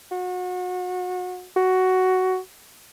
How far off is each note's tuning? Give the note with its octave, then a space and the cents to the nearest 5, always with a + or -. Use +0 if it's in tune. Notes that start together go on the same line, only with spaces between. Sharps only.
F#4 -30
F#4 +10